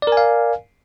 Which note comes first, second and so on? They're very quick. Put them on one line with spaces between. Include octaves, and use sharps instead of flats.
D5 A#4 G#5 F5